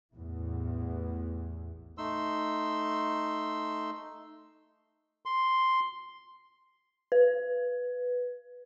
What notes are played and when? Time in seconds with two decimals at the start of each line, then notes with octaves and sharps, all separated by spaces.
0.15 A1 E2 A2 E3
1.98 A3 D#4 C6 E6
5.26 C6
7.12 B4